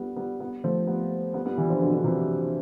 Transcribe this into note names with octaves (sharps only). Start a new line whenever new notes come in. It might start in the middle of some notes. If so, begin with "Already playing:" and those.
Already playing: G3 B3
G3 B3
G3 B3
F3 A3
G3 B3
G3 B3
G3 B3
E3 G3
D3 F3
B2 D3
D3
C3 E3